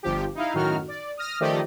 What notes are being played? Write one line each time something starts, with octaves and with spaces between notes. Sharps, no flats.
G1 F3 G4
D#4 E4 F5
F#2 A2 D#3 D#4 F#4 F6
D5
D#6 F6 A#6
D#3 F3 A3 G4 D5 D#5